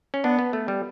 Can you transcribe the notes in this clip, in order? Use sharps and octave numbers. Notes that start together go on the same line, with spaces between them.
C#4
B3 D4
B3
A3
G3